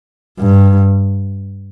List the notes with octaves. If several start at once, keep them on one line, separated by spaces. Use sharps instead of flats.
G2